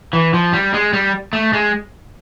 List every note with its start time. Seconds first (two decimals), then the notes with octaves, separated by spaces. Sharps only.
0.13 E3
0.34 F3
0.53 G3
0.74 G#3
0.93 G3
1.33 A3
1.53 G#3